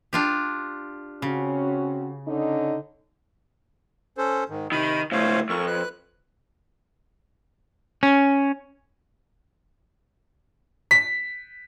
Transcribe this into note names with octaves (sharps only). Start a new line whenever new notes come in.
D4 F4 G4
C#3 C4 C#4 F#4
D3 C#4 D#4
C#4 A4 C5
G#2 D#3
C3 D#3 B5
C#2 A2 C5 C#5 F5
F2 A#4 C#6
B4 F#6
C#4
B6